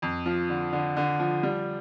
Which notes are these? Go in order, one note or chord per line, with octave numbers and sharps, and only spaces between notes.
F2
F3
D3
D3
D3
F3
G3